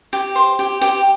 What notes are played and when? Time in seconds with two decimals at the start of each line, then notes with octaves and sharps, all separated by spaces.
0.13 G4
0.35 C5
0.59 G4
0.81 G4